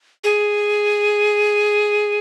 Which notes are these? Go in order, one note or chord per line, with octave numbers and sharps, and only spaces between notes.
G#4